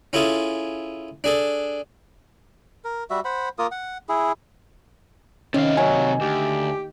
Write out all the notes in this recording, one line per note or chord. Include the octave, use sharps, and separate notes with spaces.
C#4 E4 F4 G#4 A4
D4 G#4 A4
A#4
G3 F#4 E5
C5 F#5 B5
A#3 F4 A#4 D#6
F#5
E4 G#4
C3 D#3 C#4 F5
F#3 A#3 G#5
D2 G4